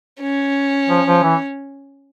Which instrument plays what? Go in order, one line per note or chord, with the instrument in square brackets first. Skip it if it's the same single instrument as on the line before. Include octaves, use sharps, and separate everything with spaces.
[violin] C#4
[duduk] F3
F3
E3